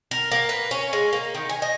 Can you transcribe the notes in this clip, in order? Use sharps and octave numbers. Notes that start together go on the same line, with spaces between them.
A#4
A#3
B4
C#4
G#3
A#3
D#3
G#5
D#5